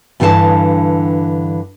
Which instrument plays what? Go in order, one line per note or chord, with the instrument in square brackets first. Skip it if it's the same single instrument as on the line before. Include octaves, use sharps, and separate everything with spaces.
[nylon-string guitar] G2 D3 E3 A4 F5 A5